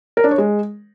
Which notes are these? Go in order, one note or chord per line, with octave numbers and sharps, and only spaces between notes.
A#4
D4
C#5
G#3